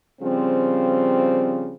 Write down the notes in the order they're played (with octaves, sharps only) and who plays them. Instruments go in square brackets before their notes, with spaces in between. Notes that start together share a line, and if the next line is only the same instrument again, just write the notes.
[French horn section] C#3 F3 G3 C4